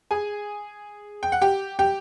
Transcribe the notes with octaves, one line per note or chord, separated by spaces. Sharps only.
G#4 G#5
G5
F#5
G4 G5
G4 G5